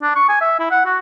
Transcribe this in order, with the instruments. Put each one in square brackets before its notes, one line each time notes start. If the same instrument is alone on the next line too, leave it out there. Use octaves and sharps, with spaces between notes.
[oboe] D4
C#6
G#5
E5
E4
F#5
F#4